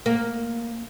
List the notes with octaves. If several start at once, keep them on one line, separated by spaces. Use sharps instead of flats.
A#3